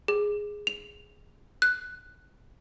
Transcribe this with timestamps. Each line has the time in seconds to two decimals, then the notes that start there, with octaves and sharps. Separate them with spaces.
0.08 G#4
0.67 F7
1.62 F#6